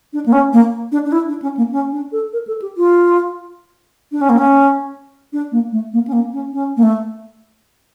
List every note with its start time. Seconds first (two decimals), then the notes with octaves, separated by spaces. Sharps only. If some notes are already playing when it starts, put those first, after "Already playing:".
0.13 D4
0.26 A#3
0.32 C#4
0.53 A#3
0.92 D4
1.06 D4
1.12 E4
1.28 D4
1.42 C#4
1.57 A#3
1.72 C#4
1.92 D4
2.12 A4
2.33 A#4
2.47 A4
2.62 G4
2.77 F4
4.12 D4
4.21 C#4
4.29 A#3
4.38 C#4
5.33 D4
5.52 A#3
5.72 A3
5.93 A#3
6.07 C#4
6.13 A#3
6.33 C#4
6.53 C#4
6.77 A#3
6.83 A3